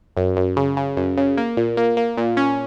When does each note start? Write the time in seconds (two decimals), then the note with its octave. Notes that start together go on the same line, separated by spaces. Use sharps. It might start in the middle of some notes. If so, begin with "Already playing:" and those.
0.17 F#2
0.37 F#2
0.57 C#3
0.77 C#3
0.97 F#2
1.18 C#3
1.38 A#3
1.57 A#2
1.77 A#3
1.97 A#3
2.18 A#2
2.37 C#4